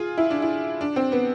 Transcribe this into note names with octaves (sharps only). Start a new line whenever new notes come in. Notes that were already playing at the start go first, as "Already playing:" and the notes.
Already playing: F4 G#4
E4
D4
E4
D4
C4
B3